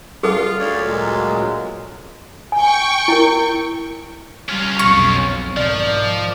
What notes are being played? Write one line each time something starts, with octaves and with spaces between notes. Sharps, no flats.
F4 G#4 A4
D2 C#5 D5
A#2 F#3 G#3
G5 G#5 C#6
E4 A#4
G3 C#4 F4
B1 F2 C#6
G#2 D#3 F3 D5